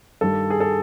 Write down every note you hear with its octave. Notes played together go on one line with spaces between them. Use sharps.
G2 D#3 G3 A4
G#4
A4